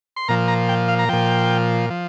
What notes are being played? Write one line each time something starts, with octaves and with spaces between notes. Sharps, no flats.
C6
A#2 F3 A#5
A#5
G5
F5
A#5
A#2 F3 G5
F3